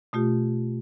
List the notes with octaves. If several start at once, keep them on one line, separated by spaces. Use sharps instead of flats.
B2 A3 F4 G4